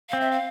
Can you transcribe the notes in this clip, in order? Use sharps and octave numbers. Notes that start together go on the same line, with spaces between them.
C4 F5
E5
F5